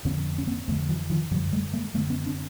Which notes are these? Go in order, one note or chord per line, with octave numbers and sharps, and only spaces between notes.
F2 D3 B3 C#4
C#4
A#3 C4
F2 D3 A3 B3
E3 F#3
D#3 F3
F#2 D3 F3 G3
G3 A3
G#3 A#3
F#2 D3 A3 B3
B3 C#4
C4 D4